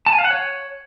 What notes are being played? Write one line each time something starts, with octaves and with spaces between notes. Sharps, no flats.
A5
G#5
F5
F#5
C#5